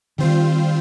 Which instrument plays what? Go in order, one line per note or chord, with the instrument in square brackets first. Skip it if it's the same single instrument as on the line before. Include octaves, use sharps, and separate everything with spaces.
[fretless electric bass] D#3 [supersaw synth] G3 C4 F4 C5